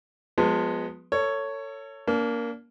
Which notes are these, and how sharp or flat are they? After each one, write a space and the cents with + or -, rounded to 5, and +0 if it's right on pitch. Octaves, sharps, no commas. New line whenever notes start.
F3 +35 G#3 +0 B3 +0
A4 +35 C#5 +5
A#3 +5 D4 -35